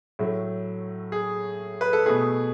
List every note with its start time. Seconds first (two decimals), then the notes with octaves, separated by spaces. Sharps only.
0.19 A2 F#3 A3
1.12 G#4
1.81 B4
1.93 A4
2.06 B2 A3 G#4